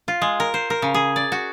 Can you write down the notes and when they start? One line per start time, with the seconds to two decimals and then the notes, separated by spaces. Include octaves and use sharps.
0.08 F4
0.22 G#3
0.40 A#4
0.54 C5
0.70 A#4
0.82 C#3
0.94 G#4
1.16 D5
1.32 F#4